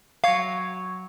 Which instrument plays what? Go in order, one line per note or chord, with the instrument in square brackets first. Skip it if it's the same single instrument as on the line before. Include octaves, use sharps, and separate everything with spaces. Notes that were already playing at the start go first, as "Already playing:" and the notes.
[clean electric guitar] F#3 C#5 [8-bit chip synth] F5